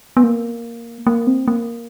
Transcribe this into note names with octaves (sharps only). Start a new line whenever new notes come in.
B3
A#3
A#3
C4
A#3